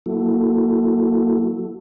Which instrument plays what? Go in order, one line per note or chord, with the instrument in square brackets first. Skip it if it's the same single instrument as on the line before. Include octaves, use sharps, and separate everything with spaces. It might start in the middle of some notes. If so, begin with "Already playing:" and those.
[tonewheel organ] F#3 A#3 E4 F#4 A4